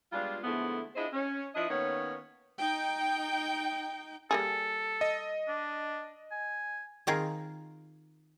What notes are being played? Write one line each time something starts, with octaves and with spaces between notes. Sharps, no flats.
G3 G#3 B3 D4 F4
D3 F3 G#3 A3 B3 E4
D4 E4 F4 G#4 C5 D#5
C#4
F3 D4 E4 D#5
D#3 A#3 B3 C#4 C#5
D#4 G5
G3 A#3 G#4 A4
D#5
D4
G#5
D#3 C4 D#4 F4 G#4 A#4